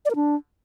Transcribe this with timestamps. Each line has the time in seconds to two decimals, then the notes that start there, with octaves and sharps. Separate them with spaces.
0.05 D5
0.10 A#4
0.15 D4